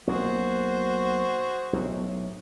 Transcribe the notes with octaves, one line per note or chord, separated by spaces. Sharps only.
B1 A#3 F#4 G#4 C5
B1 A2